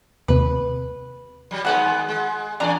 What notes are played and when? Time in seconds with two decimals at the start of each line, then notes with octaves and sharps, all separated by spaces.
0.28 D#2 C3 B4
1.51 F#3 G3
1.65 D#3 G#3 B3 F#4 F#5
2.09 G#3
2.60 E2 A#2 D4 D5 A#5